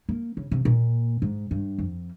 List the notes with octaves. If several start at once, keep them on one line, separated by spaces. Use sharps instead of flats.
A#3
C#3
C3
A#2
G#2
G2
F2